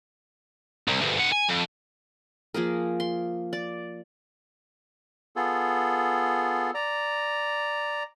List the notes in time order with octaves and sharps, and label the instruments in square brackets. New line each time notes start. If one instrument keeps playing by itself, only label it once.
[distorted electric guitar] C2
D2 G2
D#3 F#5
G#5
F2
[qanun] F3 A#3 G#4 A#4
C6
D5
[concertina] B3 F4 G#4 A4
D5 A#5